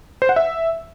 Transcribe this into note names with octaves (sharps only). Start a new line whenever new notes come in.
C5
F#5
E5